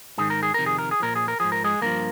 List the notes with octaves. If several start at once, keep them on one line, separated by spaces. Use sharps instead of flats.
G#2 D#3 G#4
A#4
G#4
F2 C3 D#3 A#4
G#4
A#4
G#4
A#2 F3 A#4
G#4
A#4
G#2 F3 G#4
A#4
G#3 G#4
G2 F3 A#3 A#4